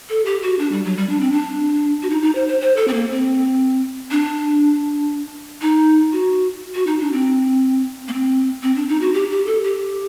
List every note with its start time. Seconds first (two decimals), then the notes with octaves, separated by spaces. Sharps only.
0.10 A4
0.26 G4
0.42 F#4
0.59 D4
0.72 G3
0.85 F#3
0.97 G3
1.10 D4
1.21 C4
1.32 D4
2.03 F#4
2.10 D#4
2.22 D#4
2.35 C5
2.48 C5
2.61 C5
2.77 A4
2.88 C4
2.94 A#3
3.11 C4
4.11 D4
5.62 D#4
6.12 F#4
6.75 F#4
6.87 D#4
7.00 D4
7.13 C4
8.08 A#3
8.13 C4
8.63 C4
8.76 D4
8.89 D#4
9.01 F#4
9.14 G4
9.31 G4
9.46 A4
9.64 G4